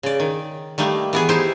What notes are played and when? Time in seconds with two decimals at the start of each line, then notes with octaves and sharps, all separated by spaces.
0.03 C#3 D5
0.20 D#3
0.78 D#3 G3 A3 A#3
1.13 E3 B3 G#4
1.29 D#4 E4 G4 C5